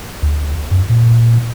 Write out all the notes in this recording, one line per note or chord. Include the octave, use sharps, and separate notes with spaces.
D2
F#2
A#2